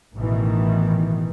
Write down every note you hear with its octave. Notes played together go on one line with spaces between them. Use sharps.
A1 B2 D#3 E3